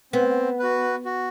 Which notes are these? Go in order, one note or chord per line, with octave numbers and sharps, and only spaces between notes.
B3 C4
F#4 B4
F#4